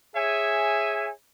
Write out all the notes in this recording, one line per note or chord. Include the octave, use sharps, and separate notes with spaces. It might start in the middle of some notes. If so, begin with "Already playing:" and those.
G#4 C#5 E5 G#5